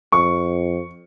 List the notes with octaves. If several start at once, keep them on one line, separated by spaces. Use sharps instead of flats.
F2 C#6